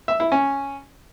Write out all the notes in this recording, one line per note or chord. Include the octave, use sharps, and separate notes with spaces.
E5
E4
C#4